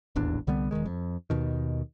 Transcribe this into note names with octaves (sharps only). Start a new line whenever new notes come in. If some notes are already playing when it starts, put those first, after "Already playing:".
D#1 A1 E2 D4
C2 D3 G3 B3
E1 D2 D#3 G#3
F2
D#2 B2 D#3